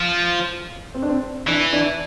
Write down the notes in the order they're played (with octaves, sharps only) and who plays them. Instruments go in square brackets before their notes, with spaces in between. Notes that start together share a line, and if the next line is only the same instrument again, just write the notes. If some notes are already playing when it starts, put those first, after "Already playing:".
Already playing: [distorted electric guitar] F3
[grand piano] C4
D4
C4
[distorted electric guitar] E3 [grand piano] D4
[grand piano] D4